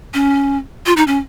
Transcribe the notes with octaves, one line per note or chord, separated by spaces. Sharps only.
C#4
F4
D#4
C#4